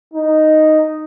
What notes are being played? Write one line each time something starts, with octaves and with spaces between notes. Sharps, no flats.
D#4